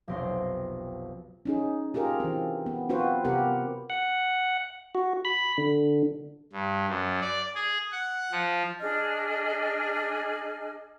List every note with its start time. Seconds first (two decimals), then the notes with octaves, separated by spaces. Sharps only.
0.08 F1 B1 B2 C4 C6 A#6
1.45 C#4 D#4 G#4
1.94 F4 G4 G#4 A#4
2.20 E3 C4
2.66 B3
2.89 C4 F4 F#4 B4 C5
3.25 C3 B3 G4 A#4 F#5
3.90 F#5
4.95 F#4
5.25 B5
5.58 D3
6.53 G2
6.89 F#2
7.21 D5
7.55 G#4
7.92 F#5
8.32 F3
8.80 D4 G#4 D#5 F6